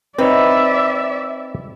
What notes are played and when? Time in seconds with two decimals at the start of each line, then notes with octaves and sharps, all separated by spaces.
0.18 C4 D#4 B4 C#5 D5 E5